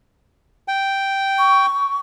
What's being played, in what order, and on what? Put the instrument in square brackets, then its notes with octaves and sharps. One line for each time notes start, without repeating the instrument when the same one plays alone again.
[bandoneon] G5
[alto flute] C#6